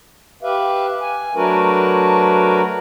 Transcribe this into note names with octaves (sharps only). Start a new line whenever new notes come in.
G4 B4 E5 F5
G#5
F#3 A3 D4 F#4 A#4 B4